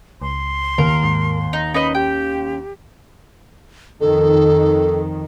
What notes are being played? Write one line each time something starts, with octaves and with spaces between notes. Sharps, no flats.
C#2 C6
D#2 A#4
G#2
D#4
C#4 D#4 B4 D#5 B5
G4 G5
F2 D#3 A4